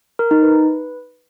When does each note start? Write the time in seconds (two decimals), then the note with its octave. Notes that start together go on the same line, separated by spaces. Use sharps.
0.19 A#4
0.31 D#4
0.43 B4